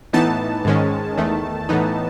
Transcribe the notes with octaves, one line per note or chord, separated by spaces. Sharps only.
A2 E3 B3 D#4 A5
G#2 D#3 G#3 C#4
E2 D#3 A3
A2 E3 B3 D#4